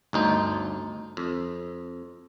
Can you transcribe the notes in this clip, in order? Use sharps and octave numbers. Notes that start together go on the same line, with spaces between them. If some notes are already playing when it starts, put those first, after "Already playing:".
G1 D2 D#4
F2